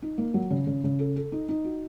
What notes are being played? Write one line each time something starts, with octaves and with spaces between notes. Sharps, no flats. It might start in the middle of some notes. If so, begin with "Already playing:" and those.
D#4
A#3
F#3
C#3
C#3
C#3
A4
A4
D#4
D#4
F#4